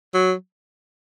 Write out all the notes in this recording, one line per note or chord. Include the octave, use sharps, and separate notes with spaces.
F#3